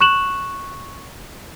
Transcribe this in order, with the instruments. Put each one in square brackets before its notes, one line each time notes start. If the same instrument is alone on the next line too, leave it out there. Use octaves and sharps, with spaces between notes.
[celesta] C#6 F#6 E7 F#7